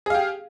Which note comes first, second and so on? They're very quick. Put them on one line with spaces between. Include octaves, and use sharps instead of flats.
G#4 F5 G4